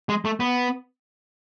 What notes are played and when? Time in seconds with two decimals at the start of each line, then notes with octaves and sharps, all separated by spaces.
0.09 G#3
0.25 A3
0.40 B3